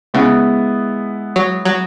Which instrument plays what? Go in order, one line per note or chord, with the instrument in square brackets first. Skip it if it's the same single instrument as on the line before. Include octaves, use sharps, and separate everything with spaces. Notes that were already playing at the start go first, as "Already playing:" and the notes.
[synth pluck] C#3 [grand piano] G#3 B3 E4
[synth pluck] F#3
F#3